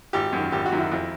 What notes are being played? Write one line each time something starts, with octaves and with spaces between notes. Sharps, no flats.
G#1 G4
F#2 D#3
G#1 G4
F#4
F#2 D#3
E4
F2 E4